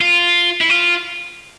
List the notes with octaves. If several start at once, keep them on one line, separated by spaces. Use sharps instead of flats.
F4
E4
F4